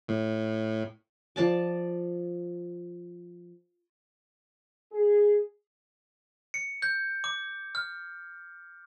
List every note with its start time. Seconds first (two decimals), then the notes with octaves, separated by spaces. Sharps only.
0.08 A2
1.36 F3 D5 A5 D6
4.92 G#4
6.54 C#7
6.82 G6
7.24 D6
7.75 F6